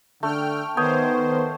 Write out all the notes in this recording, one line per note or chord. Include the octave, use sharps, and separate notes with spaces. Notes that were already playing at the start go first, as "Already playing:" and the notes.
D3 A3 G5 F6
D#3 B3 C5 C#5 G5 D#6